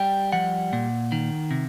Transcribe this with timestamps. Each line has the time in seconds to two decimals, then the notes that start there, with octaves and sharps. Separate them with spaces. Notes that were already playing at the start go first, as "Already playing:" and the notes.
Already playing: G3 G5
0.32 F3 F#5
0.73 A#2
1.12 D#3
1.51 C3